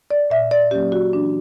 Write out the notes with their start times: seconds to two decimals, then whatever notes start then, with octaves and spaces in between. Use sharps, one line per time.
0.11 D5
0.30 A#2 E5
0.51 D5
0.71 F#3 A#3 C#4 G4
0.92 F#4
1.13 E3 D4